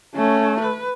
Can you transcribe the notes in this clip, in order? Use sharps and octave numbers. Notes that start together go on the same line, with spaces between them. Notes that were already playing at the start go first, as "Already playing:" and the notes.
A3 C#4
B4